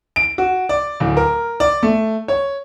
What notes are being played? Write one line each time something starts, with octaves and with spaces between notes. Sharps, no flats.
D7
F#4
D5
D1
A#4
D5
A3
C#5